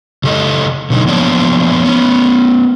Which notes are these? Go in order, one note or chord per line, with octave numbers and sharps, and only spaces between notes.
C#3 G4 A4 D#5
B2 D3 F#3 D#4
F3 A#3 B3 D4 C#5 D5
B3 C#4